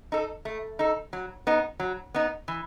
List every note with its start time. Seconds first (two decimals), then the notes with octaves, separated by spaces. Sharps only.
0.12 D#4 A4
0.45 A3
0.79 D#4 A4
1.13 F#3
1.47 B3 D#4
1.80 F#3
2.14 B3 D#4
2.48 E3